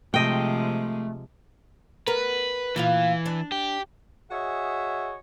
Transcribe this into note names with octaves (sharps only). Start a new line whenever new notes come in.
C3 F3 G#3 A3 D#5 G5
B3 A#4 B4
A#2 E3 F4 F5
D4
G4
F#4 G#4 C#5 D#5 E5